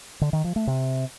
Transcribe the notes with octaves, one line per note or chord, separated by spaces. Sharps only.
D3
D#3
F3
A3
C3